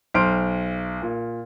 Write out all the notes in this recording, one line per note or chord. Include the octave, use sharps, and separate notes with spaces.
B1 C5 C6 F6 D7
A#2